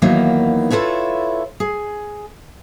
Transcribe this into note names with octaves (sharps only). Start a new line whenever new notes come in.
D#2 D#3 E3 F#3 A#3 B3
E4 F4 A4 B4 C#5
G#4